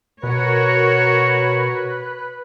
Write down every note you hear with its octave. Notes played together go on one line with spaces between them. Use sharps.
B2 F#4 A#4 B4 C#5